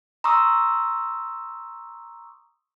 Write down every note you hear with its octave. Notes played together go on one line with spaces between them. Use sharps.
A#5 C6 C#6 D#6 E6